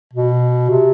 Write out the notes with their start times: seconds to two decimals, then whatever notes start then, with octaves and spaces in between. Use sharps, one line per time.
0.13 B2
0.70 C3